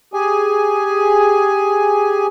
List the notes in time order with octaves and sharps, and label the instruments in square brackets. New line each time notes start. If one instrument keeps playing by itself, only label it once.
[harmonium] G4 G#4 G#5